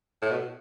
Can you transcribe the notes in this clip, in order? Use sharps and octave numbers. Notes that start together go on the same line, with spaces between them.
A2
B2